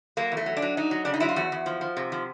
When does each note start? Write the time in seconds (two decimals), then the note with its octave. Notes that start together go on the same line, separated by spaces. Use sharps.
0.17 F#3 A#3
0.32 E2
0.37 A3
0.46 F#3
0.57 D4
0.62 F#3
0.77 F#3 D#4
0.91 F#3
1.05 C#3 D4
1.14 D#4
1.20 F#3 E4
1.29 F4
1.36 E2 F#4
1.52 E2
1.66 F3
1.81 F3
1.97 C3
2.12 F3